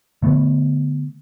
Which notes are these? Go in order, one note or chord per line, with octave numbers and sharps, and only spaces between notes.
D3 A3 B3